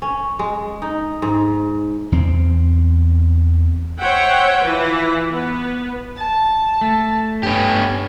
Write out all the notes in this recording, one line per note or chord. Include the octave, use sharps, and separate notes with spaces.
C#4
G#3
D#4
G#2
E2 C4
C5 C#5 E5 F#5 G5
E3 E4 F4 B4
B3 B4
A5
A3
G2 B3 C#4 G4